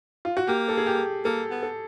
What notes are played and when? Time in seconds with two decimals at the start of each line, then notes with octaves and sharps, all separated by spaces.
0.25 F4
0.37 F#4
0.47 A#3 G4
0.68 A4
0.77 G#4
0.86 G4
1.25 A#3 A4
1.51 B3
1.63 A4